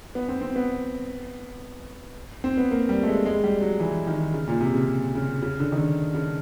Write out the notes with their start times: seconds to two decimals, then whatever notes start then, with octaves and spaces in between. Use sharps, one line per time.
0.15 B3
0.29 C4
0.41 C4
0.56 B3
2.44 C4
2.58 B3
2.71 A#3
2.89 G3
3.03 A3
3.07 G#3
3.25 G#3
3.44 G3
3.61 F#3
3.80 E3
4.07 D#3
4.34 C#3
4.48 A#2
4.61 C3
4.74 C#3
5.15 C#3
5.42 C#3
5.60 D3
5.72 D#3
5.77 D3
6.15 C#3